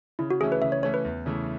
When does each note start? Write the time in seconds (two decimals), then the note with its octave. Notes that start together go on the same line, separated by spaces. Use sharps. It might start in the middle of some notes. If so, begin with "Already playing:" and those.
0.19 C#3 E4
0.31 F#4
0.41 E3 A3 C#4 G#4
0.52 B4
0.62 C#3 E5
0.72 C#5
0.83 E3 A3 C#4 C#5
0.94 B4
1.04 E2
1.26 C#3 E3 A3